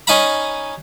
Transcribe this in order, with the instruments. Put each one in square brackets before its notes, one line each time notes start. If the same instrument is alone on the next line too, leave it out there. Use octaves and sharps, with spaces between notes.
[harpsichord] C#4 D#4 D#5 F5 A#5 B5